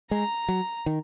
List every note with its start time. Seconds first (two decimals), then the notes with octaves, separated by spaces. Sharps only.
0.11 G#3 A#5
0.49 F#3
0.86 D#3